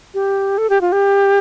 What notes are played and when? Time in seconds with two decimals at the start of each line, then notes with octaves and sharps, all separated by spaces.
0.14 G4
0.58 A4
0.70 G4
0.81 F4
0.92 G4